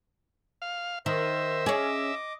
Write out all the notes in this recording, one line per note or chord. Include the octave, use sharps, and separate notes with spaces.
F5
D#3 C5 D#5 E5
C#4 G#4 D#5 D6